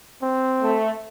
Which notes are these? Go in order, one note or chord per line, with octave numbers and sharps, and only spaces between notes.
C4
A3